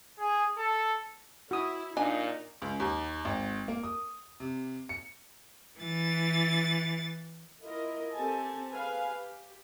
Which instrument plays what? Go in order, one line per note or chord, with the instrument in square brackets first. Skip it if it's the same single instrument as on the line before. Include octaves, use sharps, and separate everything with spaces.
[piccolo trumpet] G#4
A4
[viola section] E4 [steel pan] F#4 D#6
[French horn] A#2 [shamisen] D4 G#5 [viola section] D#4
[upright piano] C#2
D#2
G#1
A#3
D#6
C3
C#7
[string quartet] E3 A6
[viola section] E4 F4 A#4 D#5
C4 G4 A4 G#5 A5
G#4 B4 F5 G#5
G4